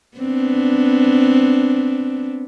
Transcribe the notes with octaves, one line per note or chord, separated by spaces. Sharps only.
B3 C4 D4